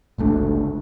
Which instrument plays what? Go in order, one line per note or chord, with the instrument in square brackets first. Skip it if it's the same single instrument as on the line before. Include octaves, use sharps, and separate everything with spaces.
[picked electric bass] G1 C#2 A3 D4